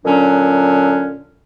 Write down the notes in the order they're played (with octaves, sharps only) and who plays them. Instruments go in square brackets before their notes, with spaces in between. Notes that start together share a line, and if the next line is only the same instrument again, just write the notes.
[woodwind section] A#2 D3 F#3 C#4 D4